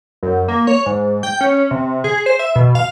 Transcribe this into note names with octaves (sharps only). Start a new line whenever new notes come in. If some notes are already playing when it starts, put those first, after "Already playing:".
F#2
A#3
C#5
G#2
G5
C#4
C3
G#4
C5
E5
B2
F5